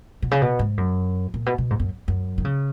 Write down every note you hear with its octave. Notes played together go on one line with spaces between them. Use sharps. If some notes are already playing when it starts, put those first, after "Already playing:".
B2
C#3
B2
G#2
F#2
A#2
B2
B2
G#2
F#2
F#2
D#3
C#3